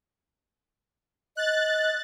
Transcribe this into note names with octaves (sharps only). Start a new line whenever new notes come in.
D#5 F#6 A6